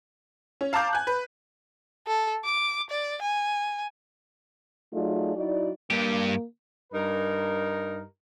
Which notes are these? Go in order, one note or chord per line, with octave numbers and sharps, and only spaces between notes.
C#4
F5 A5 A#5 D6 G6
G#5 F#6
B4
A4
D6
D5
G#5
F#3 A3 D#4 F4 G#4 D5
F#3 D#4 E4 F#4 D5
G2 A#3 G4
G2 D#4 A#4